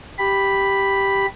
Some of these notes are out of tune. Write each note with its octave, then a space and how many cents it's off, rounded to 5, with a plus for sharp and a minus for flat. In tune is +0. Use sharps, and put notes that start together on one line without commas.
G4 +0 B5 +0